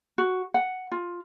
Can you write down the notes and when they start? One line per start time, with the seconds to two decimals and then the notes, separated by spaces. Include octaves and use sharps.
0.18 F#4
0.54 F#5
0.92 F4